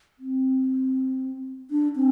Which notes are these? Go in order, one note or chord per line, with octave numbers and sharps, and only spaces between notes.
C4
D4
C4